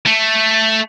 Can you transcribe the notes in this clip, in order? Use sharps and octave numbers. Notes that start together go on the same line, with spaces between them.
A3